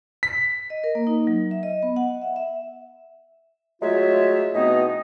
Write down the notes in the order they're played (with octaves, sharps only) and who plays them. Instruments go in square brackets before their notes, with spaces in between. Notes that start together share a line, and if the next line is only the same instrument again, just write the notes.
[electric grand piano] B6
[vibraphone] D#5
A#4
A#3
D#4
F#3
E5
D#5
B3
F#5
E5
E5
[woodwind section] F#3 G#3 A3 F4 C#5 E5
B2 E3 A3 B3 C4 D#4